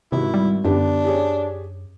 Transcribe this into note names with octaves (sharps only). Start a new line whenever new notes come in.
G#1 C3 E4 F#4
G3
F#2 D3 B3 D4 G4
G4 G#4 C#5